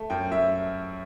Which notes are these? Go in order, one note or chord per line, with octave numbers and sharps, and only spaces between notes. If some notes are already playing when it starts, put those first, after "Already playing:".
Already playing: A3
F#2 G5
F#2 E5